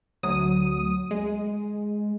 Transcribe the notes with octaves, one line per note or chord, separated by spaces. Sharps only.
D2 F#3 D#6 D#7
G#3